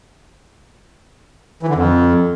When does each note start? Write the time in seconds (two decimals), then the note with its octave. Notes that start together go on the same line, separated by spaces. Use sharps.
1.63 E3
1.69 D3
1.75 F2